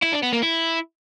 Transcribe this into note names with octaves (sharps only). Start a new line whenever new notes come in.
E4
D4
B3
A#3
E4